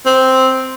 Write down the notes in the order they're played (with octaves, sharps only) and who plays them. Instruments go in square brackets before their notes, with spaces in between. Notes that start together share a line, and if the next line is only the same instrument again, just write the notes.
[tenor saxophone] C4